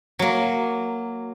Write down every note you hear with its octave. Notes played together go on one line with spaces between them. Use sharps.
F#3 A#3